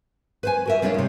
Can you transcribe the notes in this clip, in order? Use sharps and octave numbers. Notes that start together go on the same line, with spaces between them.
B4 C5 G#5
F#4 A#4 E5
G3 G#3 D4 F4 C#5
C3 D#4